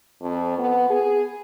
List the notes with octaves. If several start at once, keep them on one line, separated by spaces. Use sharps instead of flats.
F2
B3
G#4